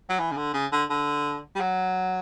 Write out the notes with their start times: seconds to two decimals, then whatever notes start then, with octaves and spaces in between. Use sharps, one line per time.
0.09 F#3
0.19 E3
0.31 C#3
0.37 D3
0.54 C#3
0.72 D3
0.90 D3
1.55 G3
1.60 F#3